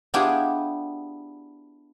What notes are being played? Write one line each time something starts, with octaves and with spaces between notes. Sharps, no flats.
B3 D4 E4 F4 G4 G#4